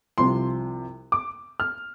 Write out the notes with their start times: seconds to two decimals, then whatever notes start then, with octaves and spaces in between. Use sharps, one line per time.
0.18 C2 C3 F3 C6
1.12 D6
1.60 F6